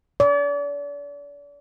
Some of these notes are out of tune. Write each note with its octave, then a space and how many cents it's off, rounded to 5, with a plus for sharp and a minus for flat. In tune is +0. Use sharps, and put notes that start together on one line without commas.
D5 -40